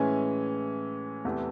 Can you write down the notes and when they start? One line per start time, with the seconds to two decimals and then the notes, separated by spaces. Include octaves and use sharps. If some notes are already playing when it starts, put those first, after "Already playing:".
Already playing: A2 E3 G#3 C#4 G#5
1.25 E2 C3 E3 A3